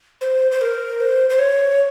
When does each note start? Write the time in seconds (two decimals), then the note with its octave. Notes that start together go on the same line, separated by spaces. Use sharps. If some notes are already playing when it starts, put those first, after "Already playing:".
0.21 C5
0.52 C5
0.61 A#4
1.00 C5
1.30 C5
1.39 C#5